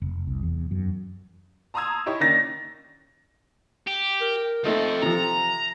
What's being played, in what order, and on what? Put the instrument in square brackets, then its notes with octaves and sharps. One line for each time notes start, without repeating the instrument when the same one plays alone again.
[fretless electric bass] F1
C2
E2
F#2
[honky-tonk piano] A5 A#5 C6 D#6 E6 G#6
D#4 E4 G4 C#5
D#3 A#3 C#4 D4 A6 A#6
[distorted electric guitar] G4
[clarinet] A#4
[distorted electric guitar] F3 C4 [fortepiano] A3 D#4 [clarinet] A4
[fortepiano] C3 F3 [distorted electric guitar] A#5